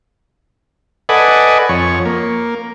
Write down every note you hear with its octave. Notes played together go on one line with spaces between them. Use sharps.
A4 B4 D5 D#5 F#5 G#5
F2 C#5
A#3